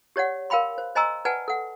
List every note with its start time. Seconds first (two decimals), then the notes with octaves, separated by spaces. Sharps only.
0.16 G4 C#5 D5 F#5
0.50 A#4 F5 G5 B5 C6
0.78 C5
0.95 C5 D#5 G#5 A#5 C6 E6
1.25 B4 D5 F#5 G#5 A5
1.48 A4 F#5